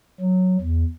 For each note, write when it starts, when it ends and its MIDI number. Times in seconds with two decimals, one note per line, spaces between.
0.20 0.57 54
0.61 0.83 40